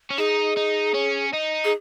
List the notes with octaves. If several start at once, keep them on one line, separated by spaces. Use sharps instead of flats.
C#4
D#4 G#4
D#4
C#4
D#4
G#4